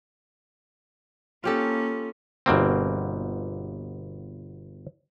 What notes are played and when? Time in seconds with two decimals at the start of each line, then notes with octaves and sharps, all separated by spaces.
1.44 A#3 C#4 F4 G4 A4
2.46 G1 B2 A#3 C4